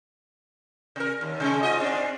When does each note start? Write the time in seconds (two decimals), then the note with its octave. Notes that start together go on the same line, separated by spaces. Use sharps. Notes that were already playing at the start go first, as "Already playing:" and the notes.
0.96 C3 A#4
1.21 D#2
1.40 C3 G#3
1.63 G#2 F4 D#5
1.80 G#2 C4 D4